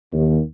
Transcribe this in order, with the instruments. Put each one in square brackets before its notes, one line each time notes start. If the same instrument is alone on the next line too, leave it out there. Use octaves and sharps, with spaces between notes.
[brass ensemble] D#2